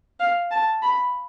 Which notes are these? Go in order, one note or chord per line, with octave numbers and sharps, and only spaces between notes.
F5
A5
B5